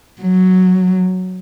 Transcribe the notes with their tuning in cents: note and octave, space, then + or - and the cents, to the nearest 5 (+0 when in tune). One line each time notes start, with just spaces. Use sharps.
F#3 +0